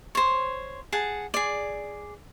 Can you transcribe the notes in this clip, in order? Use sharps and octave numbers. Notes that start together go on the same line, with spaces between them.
C5 C#5
G#4 F#5 A5
G#4 D5